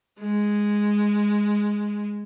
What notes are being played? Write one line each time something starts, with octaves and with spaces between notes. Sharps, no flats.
G#3